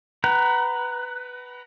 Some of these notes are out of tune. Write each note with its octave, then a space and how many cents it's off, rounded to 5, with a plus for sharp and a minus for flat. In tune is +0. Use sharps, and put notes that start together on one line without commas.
B4 +5 F#5 +35 A#5 +0